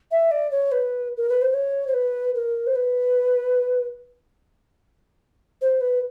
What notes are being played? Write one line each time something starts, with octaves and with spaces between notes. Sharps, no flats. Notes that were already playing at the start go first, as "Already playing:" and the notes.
E5
D5
C#5
B4
A#4
B4
C5
C#5
C5
B4
A#4
C5
B4
C5
B4